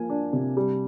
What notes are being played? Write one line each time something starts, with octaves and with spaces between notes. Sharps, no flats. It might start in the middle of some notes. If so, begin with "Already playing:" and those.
Already playing: F3 A#3 G#5
D4
C3
G3